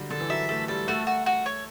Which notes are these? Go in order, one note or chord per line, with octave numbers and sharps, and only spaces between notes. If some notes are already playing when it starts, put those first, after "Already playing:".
Already playing: D3 F#3 G3
D3 A4
E3
F#3 E5
A3 A4
G3 A4
A3 F#4
F#4
F#4
C#5